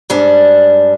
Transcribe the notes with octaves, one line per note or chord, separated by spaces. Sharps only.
G#2 G3 D4